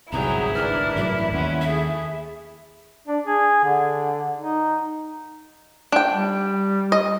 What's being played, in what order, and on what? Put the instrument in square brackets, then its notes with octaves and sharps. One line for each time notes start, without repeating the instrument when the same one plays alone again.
[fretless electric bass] G1 C2 G#2 [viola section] F#3 G#4 G5 [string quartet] E4 [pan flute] A#5
[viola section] E3 D4 A#4 [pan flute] F6
[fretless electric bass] A1 G2 F#3 [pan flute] E5
[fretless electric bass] D#2 [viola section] G#3 C#4 F#5
[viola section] A3 G#4 [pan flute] E5
[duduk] D4
G#4
D3
D#4
[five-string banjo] D4 G5
[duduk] G3
[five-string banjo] D#5